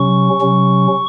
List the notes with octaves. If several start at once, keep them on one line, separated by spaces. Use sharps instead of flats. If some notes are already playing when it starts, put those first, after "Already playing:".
Already playing: C3 F#3 C#4 C#6
C3 F#3 C#4